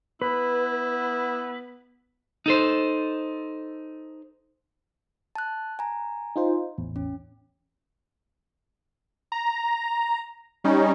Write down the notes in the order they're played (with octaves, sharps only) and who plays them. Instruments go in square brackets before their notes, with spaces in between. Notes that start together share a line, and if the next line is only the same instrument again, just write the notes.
[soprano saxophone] B3 [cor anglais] E4 [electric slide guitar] B4
[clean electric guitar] D#4 A4 C5
[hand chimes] A5 F#6
G#5 A#5
[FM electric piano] D#4 F4 C5
A1 E2
[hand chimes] C#4
[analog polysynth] A#5
G3 C#4 D#4